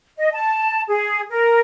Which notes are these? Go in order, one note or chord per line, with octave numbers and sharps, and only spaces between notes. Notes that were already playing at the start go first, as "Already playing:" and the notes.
D#5
A5
G#4
A#4